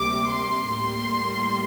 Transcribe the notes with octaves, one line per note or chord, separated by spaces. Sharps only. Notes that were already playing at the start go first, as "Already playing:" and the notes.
Already playing: D2 C3 G3 A#3 D6
C6
A2 G3 A#3